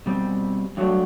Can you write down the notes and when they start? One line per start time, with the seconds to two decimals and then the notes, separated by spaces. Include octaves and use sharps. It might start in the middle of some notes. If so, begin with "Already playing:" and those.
0.06 B2 G3 C4
0.77 G2 F#3 A3 D4 F#4